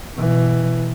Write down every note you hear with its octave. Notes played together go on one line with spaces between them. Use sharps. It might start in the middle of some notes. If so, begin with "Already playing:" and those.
B2 E3